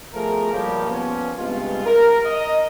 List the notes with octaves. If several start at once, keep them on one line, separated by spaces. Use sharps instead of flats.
B2 F3 A3 G#4 A#4
C#2 F3 G3 A#3 C#4 G4
F3 B3 C#4
G2 C3 G#3 B3 F4
A#4
D#5